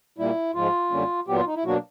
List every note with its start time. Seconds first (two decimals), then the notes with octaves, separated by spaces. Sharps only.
0.18 A#2 G3 A#3 E4
0.54 G#2 F3 G#3 F4
0.91 F#2 D3 G3 A#3 C#4
1.28 A#2 F#3 B3 G4
1.37 F4
1.46 D#4
1.55 E4
1.64 B2 F#3 A#3 D4 F#4